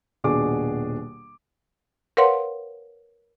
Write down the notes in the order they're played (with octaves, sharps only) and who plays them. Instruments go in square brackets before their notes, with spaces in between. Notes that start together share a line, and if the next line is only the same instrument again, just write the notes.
[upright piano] D#1 B2 D4 F#4 G#4 D6
[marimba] A#4 B4 C#5 F5 F#5 C6